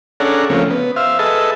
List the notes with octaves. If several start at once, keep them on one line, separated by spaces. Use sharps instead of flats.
C#4 D4 G#4 A4 F#5 A#5
C#3 F3 A3 A#3 C4 C#4
B3
C5 E5 F5
G#4 A4 B4 D#5 E5 A5